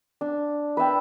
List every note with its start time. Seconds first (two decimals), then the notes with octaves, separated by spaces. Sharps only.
0.21 D4
0.77 B4 D5 E5 G5